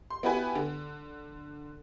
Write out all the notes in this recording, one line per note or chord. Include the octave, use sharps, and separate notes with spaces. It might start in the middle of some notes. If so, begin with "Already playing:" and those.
C6
B3 E4 F#4 G4 B4 G#5
D3